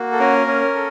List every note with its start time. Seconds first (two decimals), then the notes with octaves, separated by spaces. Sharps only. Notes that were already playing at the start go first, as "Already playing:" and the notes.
Already playing: A#3 F#4
0.12 A4
0.19 C#4 A#4
0.47 C#4
0.75 A4